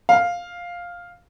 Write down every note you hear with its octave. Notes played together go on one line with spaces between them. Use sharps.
F5